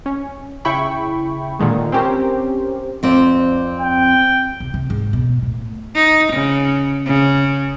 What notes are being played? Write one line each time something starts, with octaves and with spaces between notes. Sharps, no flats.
C#4
C#3 E4 G5 B5 C#6
A#2 D3 D#3 G#3
C4 C#4 G4 A#4 C5
F2 C4 D5
G5
C3
C3
G#2
B2
A2
D#4
C#3
C#3